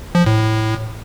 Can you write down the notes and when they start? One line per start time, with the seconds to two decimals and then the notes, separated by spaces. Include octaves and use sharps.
0.15 F3
0.26 A2
0.38 A2